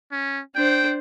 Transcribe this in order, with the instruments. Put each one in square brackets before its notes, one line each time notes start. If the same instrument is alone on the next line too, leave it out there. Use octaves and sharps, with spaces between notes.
[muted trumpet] C#4
[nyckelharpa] D4 C5 [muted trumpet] G5